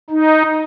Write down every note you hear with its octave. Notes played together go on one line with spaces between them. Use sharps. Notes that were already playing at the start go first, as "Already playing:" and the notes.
D#4